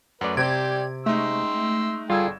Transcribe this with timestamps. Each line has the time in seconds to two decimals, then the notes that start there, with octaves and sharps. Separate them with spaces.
0.21 F#2 A3 B4 D5 F#5
0.37 C3 G4 C5 D5 G#6 D7
1.06 G#3 A3 D#4 C6 E6
2.10 G1 G3 F4 G#4 A4 G5 E6 G#6